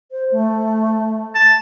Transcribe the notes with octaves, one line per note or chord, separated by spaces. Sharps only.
C5
A3
A5